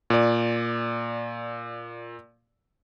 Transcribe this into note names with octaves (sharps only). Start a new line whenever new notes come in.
A#2 D5